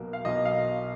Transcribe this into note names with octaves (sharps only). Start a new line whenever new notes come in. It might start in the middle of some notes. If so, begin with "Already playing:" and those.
Already playing: B1 B2 A#3
F5
B1 B2 A#3 D#5
F5